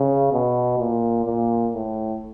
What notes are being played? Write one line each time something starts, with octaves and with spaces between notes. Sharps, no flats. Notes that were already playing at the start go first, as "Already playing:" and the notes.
Already playing: C#3
B2
A#2
A#2
A2